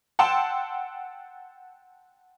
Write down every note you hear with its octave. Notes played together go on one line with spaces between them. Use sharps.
F#5 G5 A5 C6 E6 E7